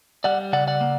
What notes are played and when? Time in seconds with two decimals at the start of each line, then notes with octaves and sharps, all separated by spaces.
0.24 G3 D5 F#5
0.53 C#3 D5 F#5
0.68 D5 F#5
0.81 A#3